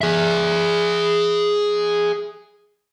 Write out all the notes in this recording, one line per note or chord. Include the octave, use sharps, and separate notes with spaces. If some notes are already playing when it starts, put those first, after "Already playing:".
G#4 E5